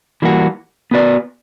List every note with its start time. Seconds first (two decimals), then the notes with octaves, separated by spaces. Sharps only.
0.22 E3 G3 A#3 D4 F#4
0.91 B3 F#4 B4 D5